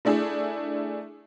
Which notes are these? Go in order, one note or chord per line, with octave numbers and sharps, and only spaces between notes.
A3 D4 E4 G#4